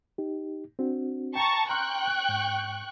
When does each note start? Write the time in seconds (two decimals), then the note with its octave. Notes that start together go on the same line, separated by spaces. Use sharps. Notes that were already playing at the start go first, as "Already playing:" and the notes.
0.18 D#4 G4
0.79 C4 D4 F#4
1.35 G5 A5 A#5 C#6
1.69 G5 A#5 C6 C#6 F6 F#6
2.29 G#2